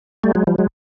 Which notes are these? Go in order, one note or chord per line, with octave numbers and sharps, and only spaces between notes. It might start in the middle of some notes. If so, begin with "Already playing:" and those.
G3 A3
F#3 G#3
F3 G3
F#3 G#3